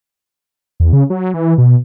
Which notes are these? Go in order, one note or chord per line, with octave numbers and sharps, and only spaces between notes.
E2
C#3
F#3
E3
B2